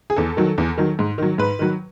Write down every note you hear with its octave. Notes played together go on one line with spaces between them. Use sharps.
G#4
E2 A4
D#3 F#3
E2
D#3 F#3
G#2
D#3 F#3
G#2 B4
D#3 F#3